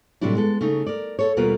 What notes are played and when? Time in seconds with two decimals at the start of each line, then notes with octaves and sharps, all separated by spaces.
0.21 A2 C3 F#3 G3 D4 E4
0.35 G#3 B3 A4
0.61 C#3 A3 D#4
0.86 A#4 D5
1.19 A4 C#5
1.37 D#2 B2 G3 F4 A#4 B4